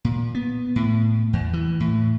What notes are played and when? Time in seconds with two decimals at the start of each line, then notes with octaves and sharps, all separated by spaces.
0.05 A#2
0.35 B3
0.76 A2
1.33 E2
1.53 E3
1.80 A2